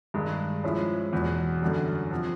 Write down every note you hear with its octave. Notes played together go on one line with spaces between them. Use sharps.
G2 D#3 G#3
F3 G#3 C#4 E4
E2 B2 F#3
F#2 D3 G3
C3 F3